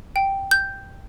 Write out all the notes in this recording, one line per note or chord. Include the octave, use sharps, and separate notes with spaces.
G5
G6